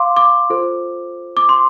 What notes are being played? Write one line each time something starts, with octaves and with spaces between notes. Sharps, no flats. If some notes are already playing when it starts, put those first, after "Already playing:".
Already playing: F5 C6 D6
D6
F4 A4 C5
D6
C6